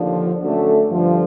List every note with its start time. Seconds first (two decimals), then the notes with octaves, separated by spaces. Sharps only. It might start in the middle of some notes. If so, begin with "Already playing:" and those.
Already playing: D#2 D3 F3
0.41 D2 D3 F#3 A3 C#4
0.90 G2 D3 F3